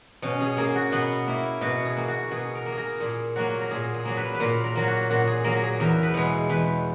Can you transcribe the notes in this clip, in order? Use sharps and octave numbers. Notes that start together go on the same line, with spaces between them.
B2 C#4
G#4
A#3 G#4
F#4
B2 B3
A#3 E4
B2 F#4
G#4
A#3
F#4
B2 G#4
A#4
A#3
G#4
A#4
A#2 G#4
F#3 A#3 F#4
A#4
A#2 G#4
G#4
F#3 A#3
B4
B4
A#2 A#4
A#4
F#3 A#3
F#4
A#2 F#4
G#4
F#3 A#3 A#4
G#4
E2 A#4
B4
B2 G#3
E2 B4